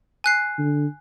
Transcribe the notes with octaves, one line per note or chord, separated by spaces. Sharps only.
G#5 F#6 C7
D3